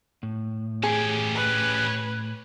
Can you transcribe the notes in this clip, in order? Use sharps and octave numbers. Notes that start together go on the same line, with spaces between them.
A2
C#4 G4 G#4
B4